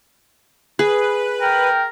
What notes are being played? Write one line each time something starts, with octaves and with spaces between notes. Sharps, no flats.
G#4 B4
A#4 G5